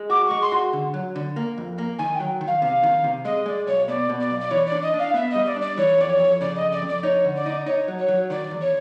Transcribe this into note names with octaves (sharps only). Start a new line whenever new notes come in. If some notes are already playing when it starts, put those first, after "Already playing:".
Already playing: G#3
F#4 D6
G#3 C#6
C6
F#4
D3
F#3
D3
A#3
F2
A#3
D#3 G#5
G5
F#3
D#3
F5
C3 F5
D#3
C3
G#3 D#5
G#3 D5
B1 C#5
B2 D5
B2
D5
B1
D5
E3 C#5
D5
D4
D#5
D4
F5
B3 E5
G3 D#5
D5
D4 D5
E3 C#5
F2 D5
C#5
F2
C#3 D5
D#5
F2
D5
F2
D5
D#4 C#5
D3
D5
D#4
D#4 C#5
F#3
C#5
F#3
D#3 D5
E2
C#5